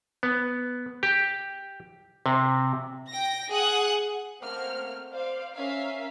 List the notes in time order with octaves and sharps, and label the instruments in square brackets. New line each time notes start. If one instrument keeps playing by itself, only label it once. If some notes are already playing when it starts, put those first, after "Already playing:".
[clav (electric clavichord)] B3
G4
C3
[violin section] G5 A#6
G#4 F#5 D#6 F#6
A3 A#3 C4 C5 F#5 F6
C5 D5 F5
C#4 A#4 E5 F5 B6